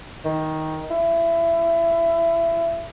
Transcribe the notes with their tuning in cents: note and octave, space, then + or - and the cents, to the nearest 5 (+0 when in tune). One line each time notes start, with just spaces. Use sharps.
D#3 +15
E4 +25